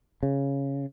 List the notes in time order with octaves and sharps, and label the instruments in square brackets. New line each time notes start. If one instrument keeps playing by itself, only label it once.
[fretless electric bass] C#3